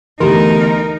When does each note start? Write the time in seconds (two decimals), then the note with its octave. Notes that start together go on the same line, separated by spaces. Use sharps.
0.20 D2 E3 B3 D#4 G4 A4 A#4 C6